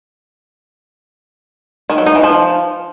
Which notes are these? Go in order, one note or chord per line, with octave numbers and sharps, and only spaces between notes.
D#3
F#3
D#4
E3
F3